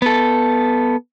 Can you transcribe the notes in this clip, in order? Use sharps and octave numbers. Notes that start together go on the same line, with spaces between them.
B3 A4